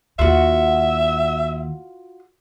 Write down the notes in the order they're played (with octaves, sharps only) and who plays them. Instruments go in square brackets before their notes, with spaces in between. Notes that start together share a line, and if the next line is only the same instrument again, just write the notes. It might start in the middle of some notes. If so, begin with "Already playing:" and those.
[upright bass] D#2 [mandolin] F4 F#4 [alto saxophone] E5